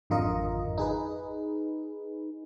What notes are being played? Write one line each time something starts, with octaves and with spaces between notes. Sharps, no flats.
G#1 F2 D3 F4 A#4 D#5
D#4 G#4 B4